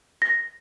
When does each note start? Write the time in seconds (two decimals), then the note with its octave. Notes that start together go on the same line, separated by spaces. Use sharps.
0.22 A#6